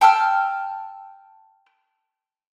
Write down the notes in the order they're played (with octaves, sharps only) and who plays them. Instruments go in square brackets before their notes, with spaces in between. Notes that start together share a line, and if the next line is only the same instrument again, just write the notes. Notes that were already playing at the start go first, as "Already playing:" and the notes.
[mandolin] G5 A5 E6 F6